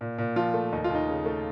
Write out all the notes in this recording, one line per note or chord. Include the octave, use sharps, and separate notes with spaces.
A#2
A#2
F3 F4
A3
D#2 D#4
F4
D#2
D#4
C#3
A3